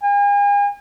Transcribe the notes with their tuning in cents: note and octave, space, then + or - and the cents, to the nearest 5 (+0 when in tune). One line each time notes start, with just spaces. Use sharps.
G#5 -40